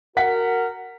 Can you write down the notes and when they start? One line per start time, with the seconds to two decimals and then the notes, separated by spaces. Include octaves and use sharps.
0.17 F#4 A#4 F#5 B6